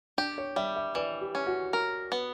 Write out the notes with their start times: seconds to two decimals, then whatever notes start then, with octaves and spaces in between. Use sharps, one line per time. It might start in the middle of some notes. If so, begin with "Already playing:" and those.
0.18 D4 G4
0.38 C#5
0.56 G3 E5
0.76 E5
0.95 E3 D5
1.21 G4
1.35 C#4
1.47 F#4
1.73 A#4
2.12 B3